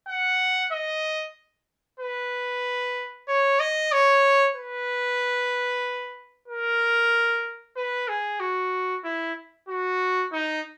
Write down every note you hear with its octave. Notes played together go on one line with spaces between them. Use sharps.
F#5
D#5
B4
C#5
D#5
C#5
B4
A#4
B4
G#4
F#4
E4
F#4
D#4